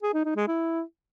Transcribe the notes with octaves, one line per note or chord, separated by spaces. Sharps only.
G#4
D#4
D#4
G#3
E4